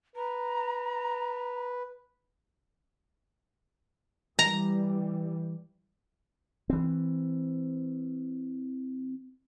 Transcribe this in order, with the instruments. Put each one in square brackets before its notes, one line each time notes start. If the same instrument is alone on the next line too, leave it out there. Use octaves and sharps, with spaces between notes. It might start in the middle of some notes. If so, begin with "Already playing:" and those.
[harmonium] B4 [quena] A#5
[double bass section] E3 G3 [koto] A#5
[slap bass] E3 C4